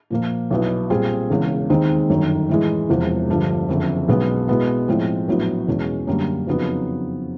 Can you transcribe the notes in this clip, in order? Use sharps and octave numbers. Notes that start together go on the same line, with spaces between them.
A#2 F3 A#3
B1 B2 F#3 B3 E4
A#2 G3 C4 F4 G#4
E1 E2 C#3
D#2 D#3 G#3 C4 D#4
G1 F#2 D#3
A2 E3 G#3
E1 E2 C3 F3
G1 G2 D3 F3
F#1 F2 D3
B1 B2 G#3 B3
B2 G#3 B3 E4
A2 F3 G#3 C4
A#1 A2 F#3 B3
E2 B2 G#3 C#4
F#2 D3 G3 A#3
F2 C#3 F#3 B3 D#4